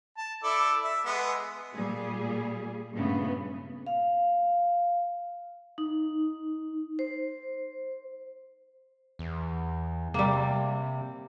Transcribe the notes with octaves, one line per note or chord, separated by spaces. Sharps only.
A5
E4 A4 D5
E5
G#3 B3
A#2 G3 G#4
G2 A#2 C#3 A3 B3
F5
D#4
C5
E2
C3 G3 A#3